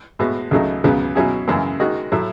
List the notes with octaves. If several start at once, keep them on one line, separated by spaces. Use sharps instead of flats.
A2 G#3 B3 F#4
C#2 C#3 F#3 A3 D#4
C#2 C#3 F#3 B3
B2 F#3 C#4 E4 G#4
F#2 C#3 E3 G#3
D#3 G#3 D#4 F#4
A2 F#3 A3 E4